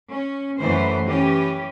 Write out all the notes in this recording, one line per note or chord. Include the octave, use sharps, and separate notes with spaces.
C#4
F#2 E3 A3 C5
E3 C#4 G4